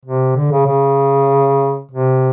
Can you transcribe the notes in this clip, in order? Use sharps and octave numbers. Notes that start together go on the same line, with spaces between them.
C3
D3
C#3
C#3
C3